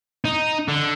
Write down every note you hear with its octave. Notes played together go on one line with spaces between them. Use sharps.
D#4
D3